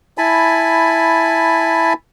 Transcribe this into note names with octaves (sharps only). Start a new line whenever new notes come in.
E4 G#5 A5 B5